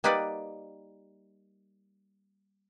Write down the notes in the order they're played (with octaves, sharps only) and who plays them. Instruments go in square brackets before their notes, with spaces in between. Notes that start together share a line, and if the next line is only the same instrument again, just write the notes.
[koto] G3 A#3 D#4 B4 D5 F#5